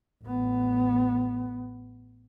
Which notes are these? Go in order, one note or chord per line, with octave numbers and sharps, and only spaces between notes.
A1 B3